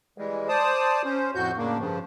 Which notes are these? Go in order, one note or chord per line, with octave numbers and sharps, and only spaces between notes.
E3 G3 G#3
C5 D5 A5 D#6
C#4 C5
F2 A2 F#4 G6
A2 C#3 A#3 D4
G2 C#3 F3